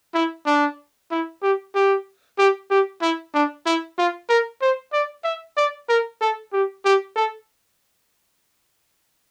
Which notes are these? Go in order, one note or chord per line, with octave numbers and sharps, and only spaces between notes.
E4
D4
E4
G4
G4
G4
G4
E4
D4
E4
F4
A#4
C5
D5
E5
D5
A#4
A4
G4
G4
A4